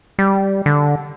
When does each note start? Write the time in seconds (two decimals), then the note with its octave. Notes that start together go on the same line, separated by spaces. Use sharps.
0.19 G3
0.66 D3